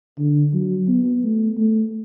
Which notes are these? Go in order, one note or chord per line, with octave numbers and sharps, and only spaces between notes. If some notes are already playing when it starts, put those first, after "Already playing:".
D3
F#3
B3
A3
A3